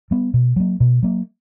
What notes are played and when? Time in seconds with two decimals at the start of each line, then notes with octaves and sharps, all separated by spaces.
0.11 G3 B3
0.34 B2
0.56 F#3 A#3
0.80 B2
1.03 F#3 A#3